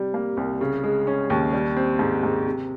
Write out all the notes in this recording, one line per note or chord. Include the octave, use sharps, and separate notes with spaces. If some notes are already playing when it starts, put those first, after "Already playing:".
Already playing: C3 G3
A#3
C2
C#3
G#3
C#4
D#2
G3
C4
G#2
G#2
C3